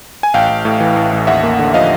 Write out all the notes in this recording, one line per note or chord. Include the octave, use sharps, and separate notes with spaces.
G#5
A1 F5 G5
A1
A2
E3
A1
A1
D#2 E5 F#5
A#3
D3
F3 D#5 F5